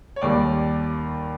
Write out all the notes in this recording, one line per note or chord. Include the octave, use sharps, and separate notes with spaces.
C#5
D#2 D#3 G3 D5